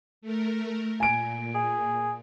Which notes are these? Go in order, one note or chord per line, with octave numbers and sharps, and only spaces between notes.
A3 A#4
A#2 G#5 D7
G#4